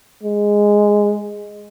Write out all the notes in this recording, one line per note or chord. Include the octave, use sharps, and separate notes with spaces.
G#3